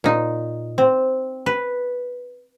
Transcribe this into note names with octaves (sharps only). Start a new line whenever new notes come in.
A#2 D#4
C4
B4